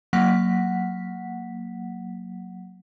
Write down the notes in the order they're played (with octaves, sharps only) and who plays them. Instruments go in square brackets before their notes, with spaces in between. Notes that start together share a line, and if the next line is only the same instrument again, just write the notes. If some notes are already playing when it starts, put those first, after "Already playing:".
[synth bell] F#3 A#3 F#5 B6